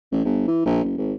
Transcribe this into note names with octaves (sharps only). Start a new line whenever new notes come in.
A1
G1
E3
A#1
F#1
G#1